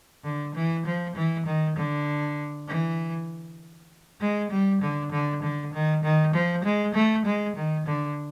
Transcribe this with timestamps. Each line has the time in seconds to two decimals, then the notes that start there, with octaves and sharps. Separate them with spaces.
0.24 D3
0.55 E3
0.85 F3
1.15 E3
1.46 D#3
1.77 D3
2.68 E3
4.21 G#3
4.50 G3
4.82 D3
5.12 D3
5.42 D3
5.73 D#3
6.03 D#3
6.34 F3
6.64 G#3
6.94 A3
7.25 G#3
7.56 D#3
7.86 D3